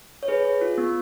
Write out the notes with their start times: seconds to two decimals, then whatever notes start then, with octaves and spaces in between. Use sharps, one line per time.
0.23 C#5
0.28 G#4 B4
0.44 G#4
0.61 F4
0.78 B3